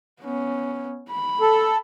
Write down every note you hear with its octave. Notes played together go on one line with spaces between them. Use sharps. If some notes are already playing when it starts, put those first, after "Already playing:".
B3 C#4
B5
A4